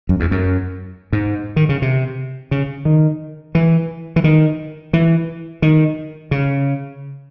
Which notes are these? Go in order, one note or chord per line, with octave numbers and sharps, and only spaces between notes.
F#2
E2
F#2
G#2
D#3
C#3
C3
C#3
D#3
E3
E3
D#3
E3
D#3
C#3